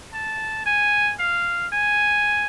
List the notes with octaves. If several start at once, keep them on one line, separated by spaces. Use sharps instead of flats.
A5
G#5
F5
G#5